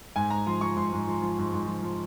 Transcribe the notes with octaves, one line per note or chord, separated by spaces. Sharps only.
G#2 G#5
G#2 A#5
F3 C6
F3 C#6
G#2 C6
G#2
F3
F3
G#2
G#2
F3
F3